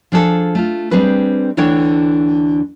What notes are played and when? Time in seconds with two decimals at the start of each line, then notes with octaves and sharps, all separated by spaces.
0.12 F3 D4 G#4 A4
0.55 A3 F4
0.91 G3 C4 D4 G#4 B4
1.57 D2 D3 E3 D4 C#5 G5